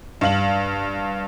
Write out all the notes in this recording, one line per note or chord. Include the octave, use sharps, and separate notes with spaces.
G2 F5 F#7